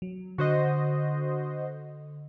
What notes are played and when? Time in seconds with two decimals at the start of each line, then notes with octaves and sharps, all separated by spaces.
0.02 F#3
0.38 D3 F#4 C5 D#5